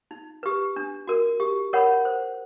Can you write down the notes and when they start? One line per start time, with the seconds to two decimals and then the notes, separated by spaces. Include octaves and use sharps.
0.11 D#4
0.43 G4 B4
0.76 D4
1.07 F#4 A#4
1.40 G4
1.73 A#4 C#5 F#5 B5
2.05 C5